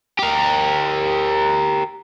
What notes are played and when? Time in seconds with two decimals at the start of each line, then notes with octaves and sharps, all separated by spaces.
0.19 G4 A#4